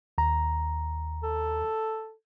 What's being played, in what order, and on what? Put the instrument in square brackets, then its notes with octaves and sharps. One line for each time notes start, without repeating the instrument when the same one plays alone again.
[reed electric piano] D#2 A#5
[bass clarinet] A4